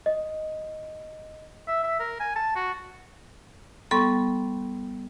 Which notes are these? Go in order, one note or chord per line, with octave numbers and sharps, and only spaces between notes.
D#5
E5
E5
A#4
G#5
A5
F#4
G3 B3 A4 C6 C#6